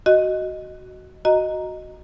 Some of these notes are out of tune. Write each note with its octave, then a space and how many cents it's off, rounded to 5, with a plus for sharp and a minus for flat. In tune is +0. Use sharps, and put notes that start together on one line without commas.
F#4 +10 D#5 +0
F#4 +0 D#5 +0 A#5 +0